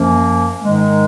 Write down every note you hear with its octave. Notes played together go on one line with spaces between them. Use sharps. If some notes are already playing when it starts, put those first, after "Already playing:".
Already playing: F#2 F3 A#3 C#4
G#2 D#3 G#3